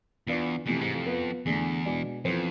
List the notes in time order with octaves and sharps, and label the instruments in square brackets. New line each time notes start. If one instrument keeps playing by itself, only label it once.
[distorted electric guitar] E2 [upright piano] E3 B3 D4 F4
[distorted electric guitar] F2 [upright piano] C3 E3 A3
[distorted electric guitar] G#2
F2
[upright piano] B3 F4 B4
[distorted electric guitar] E2 [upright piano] D3 A3 D4 G#4
[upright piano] B2 G#3 D4
[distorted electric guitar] F2 [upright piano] E3 B3 F4 A4 C5